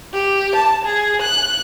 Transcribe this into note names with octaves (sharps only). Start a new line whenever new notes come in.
G4
A5
G#4
F#6